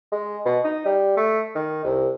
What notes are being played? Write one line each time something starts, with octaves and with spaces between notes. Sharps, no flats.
G#3
B2
D#4
G3
A3
D#3
C2